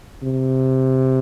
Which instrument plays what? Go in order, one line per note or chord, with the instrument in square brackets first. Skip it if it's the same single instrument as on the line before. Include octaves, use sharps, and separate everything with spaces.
[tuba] C3